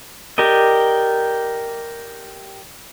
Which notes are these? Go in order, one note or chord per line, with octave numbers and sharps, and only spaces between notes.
G4 A#4 D5 D#5